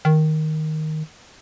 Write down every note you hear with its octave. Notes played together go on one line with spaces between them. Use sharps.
D#3